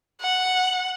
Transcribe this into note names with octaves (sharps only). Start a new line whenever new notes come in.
F#5